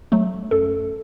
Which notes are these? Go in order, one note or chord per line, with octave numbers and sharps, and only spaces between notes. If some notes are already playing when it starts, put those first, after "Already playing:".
F#3 A3
F#2 A4